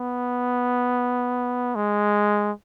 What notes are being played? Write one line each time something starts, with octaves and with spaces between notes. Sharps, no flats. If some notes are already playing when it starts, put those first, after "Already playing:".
Already playing: B3
G#3